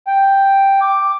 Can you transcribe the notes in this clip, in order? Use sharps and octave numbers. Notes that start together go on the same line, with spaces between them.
G5
D6